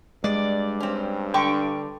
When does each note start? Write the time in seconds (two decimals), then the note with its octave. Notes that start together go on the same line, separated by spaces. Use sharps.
0.24 G2 G#3 D5
0.80 C4 C#4
1.34 D3 G5 C#6 D6